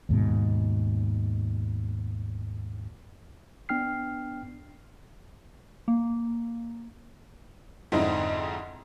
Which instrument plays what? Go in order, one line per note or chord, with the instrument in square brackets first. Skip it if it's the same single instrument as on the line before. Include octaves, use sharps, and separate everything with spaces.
[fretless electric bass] D#2 G#2 B2
[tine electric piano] B3 D4 G5 F6 C7
[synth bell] A#3
[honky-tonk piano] F2 G#2 D3 C4 D#4 E4